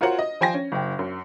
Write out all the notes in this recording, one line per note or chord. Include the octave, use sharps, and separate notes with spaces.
F4 F#4 A#4 C5 C#5 F#5
D#5
F3 C5 G5 G#5 C6 A#6
C#4
F#1 G5
F#2